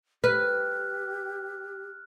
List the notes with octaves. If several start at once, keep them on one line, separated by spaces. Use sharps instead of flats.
G4 B4 F6 F#6